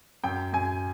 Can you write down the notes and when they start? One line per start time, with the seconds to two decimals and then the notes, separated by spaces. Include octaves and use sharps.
0.23 F#2 G5
0.53 F#2 G#5